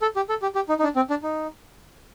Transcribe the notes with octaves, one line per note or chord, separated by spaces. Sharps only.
A4
G4
A4
G4
G4
D#4
D#4
D4
C4
D4
D#4